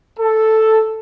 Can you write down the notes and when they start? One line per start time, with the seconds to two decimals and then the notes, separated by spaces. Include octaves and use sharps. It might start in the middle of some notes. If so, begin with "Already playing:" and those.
0.19 A4